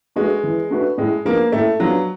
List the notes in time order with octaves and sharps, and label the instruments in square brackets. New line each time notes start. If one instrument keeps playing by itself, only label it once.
[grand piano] G#3 [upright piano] A3 D4 F#4 B4
[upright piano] E3
A3 D4 F#4 B4
[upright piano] A2 [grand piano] G#3
[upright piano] F3 G#3 B3 D4 [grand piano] A#3
[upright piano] A2 [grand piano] A3
[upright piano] F3 G#3 B3 D4 [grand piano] F#3